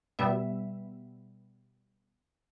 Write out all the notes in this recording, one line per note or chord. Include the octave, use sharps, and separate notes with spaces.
B2 G3 B3 E5